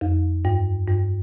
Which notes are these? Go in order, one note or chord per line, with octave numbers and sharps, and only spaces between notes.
F2
G2
G2